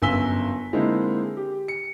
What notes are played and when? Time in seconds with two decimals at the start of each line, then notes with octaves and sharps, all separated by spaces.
0.02 G1 F#2 G#5 E6 B6 G7
0.73 D3 G#3 A#3 C4 D#4 E4
1.37 G4
1.68 C#7